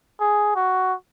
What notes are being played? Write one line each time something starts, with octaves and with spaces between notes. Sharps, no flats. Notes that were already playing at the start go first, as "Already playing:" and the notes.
G#4
F#4